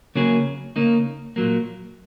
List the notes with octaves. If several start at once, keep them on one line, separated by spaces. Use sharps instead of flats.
C#3 F#3 A#3 C#4 G#4
C#3 A#3 D#4
A#2 F#3 A#3